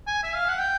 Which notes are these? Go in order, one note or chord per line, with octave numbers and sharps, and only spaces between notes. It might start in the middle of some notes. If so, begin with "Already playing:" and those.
G#5
E5
F5
F#5
G5